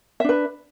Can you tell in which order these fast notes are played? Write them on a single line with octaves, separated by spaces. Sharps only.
E5 D4 B4